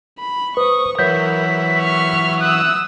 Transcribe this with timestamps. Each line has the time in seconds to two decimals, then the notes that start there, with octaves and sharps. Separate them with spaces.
0.19 B5
0.57 B4 C5 C#6 D#6
0.99 E3 F#3 A#4 B4 C#5 G6 B6
1.79 C#6 F6
2.41 D#6 E6 F#6